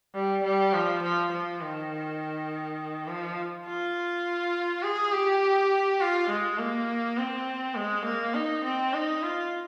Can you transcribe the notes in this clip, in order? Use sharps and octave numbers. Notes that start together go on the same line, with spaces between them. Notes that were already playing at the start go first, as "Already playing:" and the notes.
G3
G3
F3
F3
F3
D#3
F3
F4
G#4
G4
F4
G#3
A#3
C4
G#3
A#3
D#4
C4
D#4
F4